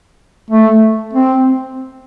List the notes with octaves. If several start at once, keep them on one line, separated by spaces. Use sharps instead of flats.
A3
C4